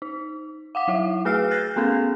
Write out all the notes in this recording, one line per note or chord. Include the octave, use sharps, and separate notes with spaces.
D#4
F5 F#5 D6
F#3 E4 E5
A3 G#4 B4 E6 F6 C7
F#6 G6 A6 A#6 C7
A3 B3 C#4 G#4 A4